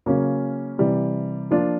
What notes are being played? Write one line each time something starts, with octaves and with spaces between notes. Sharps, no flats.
C#3 F#3 A#3 C#4
C3 E3 G3
F3 A#3 D4 F4